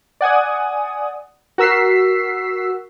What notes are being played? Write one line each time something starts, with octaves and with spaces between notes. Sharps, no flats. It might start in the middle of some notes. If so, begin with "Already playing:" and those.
D5 F#5 G#5 D#6
F#4 A#4 E6 B6 C7